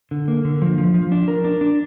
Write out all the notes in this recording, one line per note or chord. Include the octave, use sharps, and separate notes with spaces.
D3
A#3
D3
F3
F3
F3
D4
A#4
D4
D4